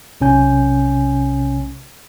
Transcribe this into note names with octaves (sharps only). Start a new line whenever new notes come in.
B1 C3 C#4 G#5 G6